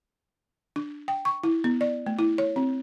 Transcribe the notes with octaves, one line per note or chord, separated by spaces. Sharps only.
D4
G5
C#6
E4
B3
D5
A3
E4
C#5
C4